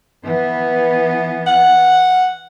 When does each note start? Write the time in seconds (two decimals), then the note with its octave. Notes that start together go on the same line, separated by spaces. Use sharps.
0.24 E3 B3
1.47 F#5